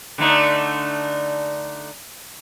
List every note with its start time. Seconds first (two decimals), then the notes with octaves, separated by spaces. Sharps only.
0.18 D3 A3 D#4